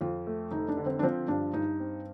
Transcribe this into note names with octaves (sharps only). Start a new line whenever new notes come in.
F2 F4
A3
F1 D#4
D4
D3
C4
D4
F3 C4
G2 D4
G2 D#4
C4